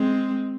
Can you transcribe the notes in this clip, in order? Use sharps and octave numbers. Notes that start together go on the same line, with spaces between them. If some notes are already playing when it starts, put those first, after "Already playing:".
Already playing: G#3 C4